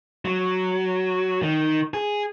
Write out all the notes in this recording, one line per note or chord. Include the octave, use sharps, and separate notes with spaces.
F#3
D#3
G#4